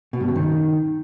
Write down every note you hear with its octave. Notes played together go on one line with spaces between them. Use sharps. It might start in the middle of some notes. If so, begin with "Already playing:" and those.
B2
G2
C#3
D#3